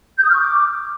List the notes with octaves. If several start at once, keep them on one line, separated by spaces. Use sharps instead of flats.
G6
D#6
F6
C#6
D6